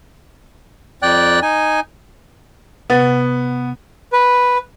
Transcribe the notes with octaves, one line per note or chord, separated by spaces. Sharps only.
F2 D5 G5 F#6
D#4 G#5
C3 B3 B4 A6
B4